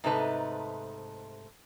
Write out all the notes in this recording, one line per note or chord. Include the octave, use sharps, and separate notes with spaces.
G#2 C3 A3 D#4 B4 A5